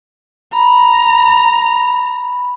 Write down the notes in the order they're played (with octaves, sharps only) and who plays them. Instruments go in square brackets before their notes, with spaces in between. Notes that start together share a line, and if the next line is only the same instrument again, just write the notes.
[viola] A#5 [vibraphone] B5